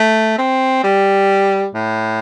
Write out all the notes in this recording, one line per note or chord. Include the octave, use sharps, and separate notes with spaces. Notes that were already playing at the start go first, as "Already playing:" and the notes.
Already playing: A3
C4
G3
A2